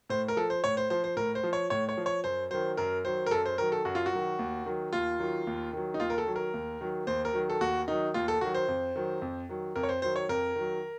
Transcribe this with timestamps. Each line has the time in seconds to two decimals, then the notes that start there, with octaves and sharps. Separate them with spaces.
0.09 A2 C5
0.28 A#4
0.36 F3 A4
0.50 C5
0.64 A2 C#5
0.77 C5
0.90 F3 C5
1.04 C5
1.16 A2 A#4
1.35 C5
1.43 F3
1.53 C#5
1.70 A2 C#5
1.89 C#5
1.97 F3
2.06 C#5
2.24 F#2 C5
2.51 D#3 F#3 C5
2.77 F#2 A#4
3.04 D#3 F#3 C5
3.26 A#4
3.31 F#2 A4
3.46 C5
3.58 D#3 F#3 A#4
3.72 A4
3.85 F#2 F#4
3.95 F4
4.06 F#4
4.13 D#3 F#3
4.39 D#2
4.66 D#3 F#3
4.93 D#2 F4
5.20 D#3 F#3
5.47 D#2
5.73 D#3 F#3
5.94 D#4
6.00 D#2 F4
6.10 A#4
6.18 A4
6.26 D#3 F#3
6.36 A#4
6.54 D#2
6.81 D#3 F#3
7.07 D#2 C5
7.25 A#4
7.33 D#3 F#3
7.50 A4
7.61 D#2 F#4
7.88 D#3 F#3 D#4
8.14 D#2 F4
8.28 A4
8.41 D#3 F#3 F#4
8.55 C5
8.68 F2
8.96 D#3 F#3
9.22 F2
9.49 D#3 F#3
9.76 F2 A#4
9.83 C#5
9.89 C5
10.02 D#3 F#3 C5
10.16 C#5
10.29 F2 A#4
10.56 D#3 F#3